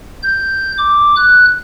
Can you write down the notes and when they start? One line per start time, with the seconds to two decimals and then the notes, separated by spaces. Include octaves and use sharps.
0.23 G6
0.78 D6
1.16 F#6